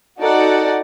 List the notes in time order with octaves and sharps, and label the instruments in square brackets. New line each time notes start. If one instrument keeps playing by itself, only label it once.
[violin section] D#4 F#4 A4 D5 F#5